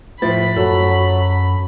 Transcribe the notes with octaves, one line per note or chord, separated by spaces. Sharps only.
A2 F3 B5 A6
F#2 F#3 F#4 A4